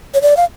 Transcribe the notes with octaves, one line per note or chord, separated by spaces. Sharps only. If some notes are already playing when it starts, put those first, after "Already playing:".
C#5
D5
F5